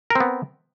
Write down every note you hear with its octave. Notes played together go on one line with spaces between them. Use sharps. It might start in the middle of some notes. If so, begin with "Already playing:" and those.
B3 C4 A#4